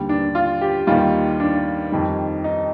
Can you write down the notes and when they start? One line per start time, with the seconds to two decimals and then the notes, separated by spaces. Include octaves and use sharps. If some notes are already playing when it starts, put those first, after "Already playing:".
Already playing: D#2 D3 G3
0.09 D4
0.35 F4
0.61 G4
0.87 D#2 D#3 G3 F4
1.40 D4
1.92 F2 D#3 G3
2.44 D#4